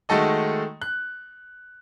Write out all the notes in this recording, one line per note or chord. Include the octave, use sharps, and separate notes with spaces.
D#3 G#3 A3 F#4 A4 D#5
F#6